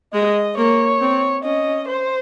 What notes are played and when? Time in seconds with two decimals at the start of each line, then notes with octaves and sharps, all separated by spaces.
0.14 G#3 D#5
0.57 A#3 C#5
1.01 C4
1.44 C#4 D#5
1.88 C5